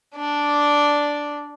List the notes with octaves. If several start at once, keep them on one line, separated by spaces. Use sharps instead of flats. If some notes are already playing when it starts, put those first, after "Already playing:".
D4 D5